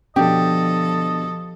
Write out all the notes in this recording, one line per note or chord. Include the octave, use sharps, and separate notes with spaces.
B2 D3 F3 G4 A4 D#5